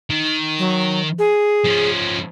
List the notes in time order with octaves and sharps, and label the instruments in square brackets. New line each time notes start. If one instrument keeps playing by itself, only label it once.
[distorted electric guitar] D#3
[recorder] F#3
G#4
[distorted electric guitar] F3 C#4